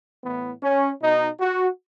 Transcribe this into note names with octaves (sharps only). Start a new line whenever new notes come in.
A2 E3 B3
C#4
B2 D#4
F#4